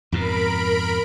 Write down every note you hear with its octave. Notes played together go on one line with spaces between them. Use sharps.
F2 G#2 B2 A#4 B5 D7